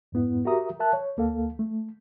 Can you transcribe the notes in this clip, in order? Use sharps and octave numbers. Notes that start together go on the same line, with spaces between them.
F2 G#2 B3 E4
F#4 G4 A#4 E5 A#5 D#6
A#4 E5 A5 F#6
C#5
D2 A#3 A4 F5
A3